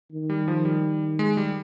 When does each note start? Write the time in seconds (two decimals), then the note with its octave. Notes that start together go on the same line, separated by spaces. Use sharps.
0.11 D#3
0.30 G3
0.48 F3
0.65 G3
1.19 G#3
1.37 G3